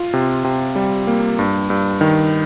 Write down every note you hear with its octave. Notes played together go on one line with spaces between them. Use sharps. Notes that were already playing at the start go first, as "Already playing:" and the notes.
Already playing: F4
C3
C3
G3
A#3
G2
G2
D#3